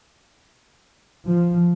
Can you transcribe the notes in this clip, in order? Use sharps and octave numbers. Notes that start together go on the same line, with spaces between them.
F3